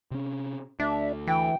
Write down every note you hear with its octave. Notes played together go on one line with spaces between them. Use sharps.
C3 C#4
D2 D4 E5
E3 G5